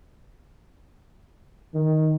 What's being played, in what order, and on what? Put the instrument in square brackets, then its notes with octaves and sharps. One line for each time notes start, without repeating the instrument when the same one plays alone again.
[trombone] D#3